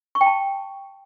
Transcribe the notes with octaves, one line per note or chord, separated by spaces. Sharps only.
C#6
G5
A5